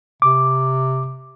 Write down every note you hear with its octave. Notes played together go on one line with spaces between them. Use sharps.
C3 D6